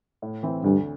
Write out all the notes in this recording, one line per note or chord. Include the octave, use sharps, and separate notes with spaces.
A2
E3 C4 E4
D2 G2